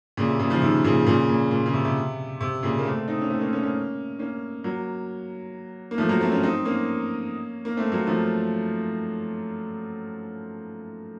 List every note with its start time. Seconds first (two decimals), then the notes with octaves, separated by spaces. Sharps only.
0.17 A#2 C#3
0.28 C3
0.39 A#2 C#3
0.50 C#3 F3
0.62 C3 D#3
0.84 A#2 C#3
1.06 A#2 C#3
1.29 A#2
1.51 A#2
1.66 C#3
1.74 C3
1.85 C3
2.41 C3
2.63 A#2 C#3
2.78 A#3
2.85 A3 C4
3.08 C4 D#4
3.21 C#4
3.30 A3 C4
3.41 A#3 C#4
3.53 A#3 C#4
3.63 A#3 C#4
4.19 A#3 C#4
4.64 F#3 A#3
5.91 A#3
5.98 F3 A3
6.09 F#3 A#3
6.21 A3 C4
6.32 A#3 C#4
6.43 C4 D#4
6.65 A#3 C#4
7.65 A#3
7.77 A3 C4
7.92 F#3 A#3
8.07 F3 A3